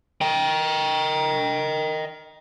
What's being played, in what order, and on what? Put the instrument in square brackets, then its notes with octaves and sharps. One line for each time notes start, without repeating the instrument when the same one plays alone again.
[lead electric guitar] D#5 G5